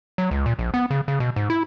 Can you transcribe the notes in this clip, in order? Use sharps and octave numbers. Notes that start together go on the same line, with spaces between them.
F#3
C#2
A#2
A#1
B3
C#3
C#3
B2
G#2
E4